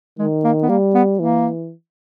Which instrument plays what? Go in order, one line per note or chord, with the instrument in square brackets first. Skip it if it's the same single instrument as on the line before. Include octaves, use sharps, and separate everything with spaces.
[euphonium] D#3 [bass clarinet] G#3
[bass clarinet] A#3
B3
[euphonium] G3 [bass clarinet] A#3
[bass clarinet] B3
[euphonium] E3 [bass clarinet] A#3